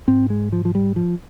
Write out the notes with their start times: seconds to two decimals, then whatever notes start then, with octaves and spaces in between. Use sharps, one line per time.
0.08 G#2 C4
0.30 G#3
0.52 F3
0.65 F3
0.75 G3
0.96 F3